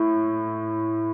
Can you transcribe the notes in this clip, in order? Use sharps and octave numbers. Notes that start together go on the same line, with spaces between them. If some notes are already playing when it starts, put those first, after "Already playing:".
Already playing: A2